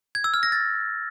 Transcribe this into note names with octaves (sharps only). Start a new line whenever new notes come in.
G#6
E6
F6
A#6
A6